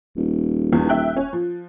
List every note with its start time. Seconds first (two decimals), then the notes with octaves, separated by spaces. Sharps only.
0.17 D#1
0.73 E2
0.89 E5 G5 F#6
1.16 C#4
1.33 F3